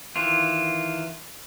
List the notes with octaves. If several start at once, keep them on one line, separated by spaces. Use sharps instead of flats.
D#3 E3 F4